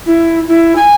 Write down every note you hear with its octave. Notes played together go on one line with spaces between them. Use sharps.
E4
E4
G#5